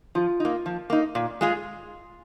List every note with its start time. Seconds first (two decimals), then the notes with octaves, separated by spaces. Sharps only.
0.15 F3 F4
0.40 A#3 D#4
0.66 F3
0.90 A#3 D#4
1.15 A#2
1.41 G#3 F4 G#4